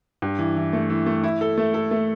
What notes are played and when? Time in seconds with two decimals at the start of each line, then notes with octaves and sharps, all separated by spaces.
0.22 G2
0.39 E3
0.56 E3
0.73 A3
0.90 E3
1.06 A3
1.24 E4
1.41 A4
1.58 A3
1.74 A4
1.91 A3